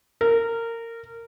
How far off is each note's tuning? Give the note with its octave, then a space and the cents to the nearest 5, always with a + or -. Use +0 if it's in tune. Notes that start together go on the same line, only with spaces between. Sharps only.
A#4 -20